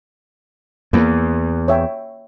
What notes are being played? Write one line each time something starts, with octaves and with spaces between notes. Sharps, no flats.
E2 A#3
C#5 E5 G5